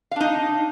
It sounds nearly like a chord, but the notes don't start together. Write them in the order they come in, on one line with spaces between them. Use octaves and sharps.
F5 D4 D#4